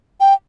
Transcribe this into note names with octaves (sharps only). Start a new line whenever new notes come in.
G5